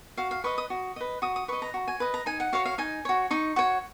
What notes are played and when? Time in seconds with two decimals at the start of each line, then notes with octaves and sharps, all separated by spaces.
0.17 F#4 F5
0.31 F5
0.44 B4 D#5 C#6
0.58 D#6
0.70 F#4
0.96 B4 D#5
1.22 F#4 D#6
1.36 D#6
1.48 B4 D#5 C#6
1.62 A#5
1.74 F#4
1.88 G#5
2.00 B4 D#5
2.14 A#5
2.26 D#4 G#5
2.40 F#5
2.53 F#4 C#5 F5
2.66 F5
2.78 D#4 G#5
3.05 F#4 C#5
3.31 D#4 C#6
3.56 F#4 C#5